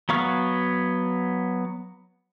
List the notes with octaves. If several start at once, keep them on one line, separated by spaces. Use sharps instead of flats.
F#3 B3 F5 C#6 F6